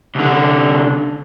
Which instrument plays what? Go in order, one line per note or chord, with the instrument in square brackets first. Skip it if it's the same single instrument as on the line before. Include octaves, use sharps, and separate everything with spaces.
[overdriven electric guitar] C2 D3